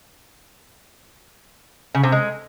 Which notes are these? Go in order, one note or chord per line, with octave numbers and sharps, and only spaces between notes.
C#3
C3
G#3